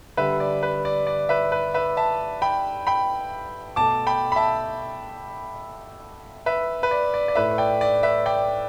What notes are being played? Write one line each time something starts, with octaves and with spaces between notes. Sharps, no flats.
D3 G3 B4 E5
D5
B4
D5
D5
B4 E5
B4
B4 E5
E5 A5
G5 B5
G5 B5
B2 A3 A5 D6
G5 B5
B5
E5 A5
B4 E5
B4
D5
D5
D5
A2 A3 B4 E5
D5 G5
D5
B4 E5
D5 G5